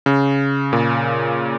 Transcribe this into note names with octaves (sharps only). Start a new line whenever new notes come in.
C#3
A#2